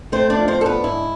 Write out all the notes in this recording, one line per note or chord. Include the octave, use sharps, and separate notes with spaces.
A3 C4 C5
D4 D5
F3
C4 C5
D4 A4
B3 B4
G#2 E4